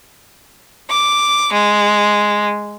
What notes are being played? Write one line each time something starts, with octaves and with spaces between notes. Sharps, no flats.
D6
G#3